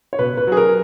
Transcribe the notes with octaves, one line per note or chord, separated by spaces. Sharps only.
C#5
B2 B4
B4
F#3 G#4
A#4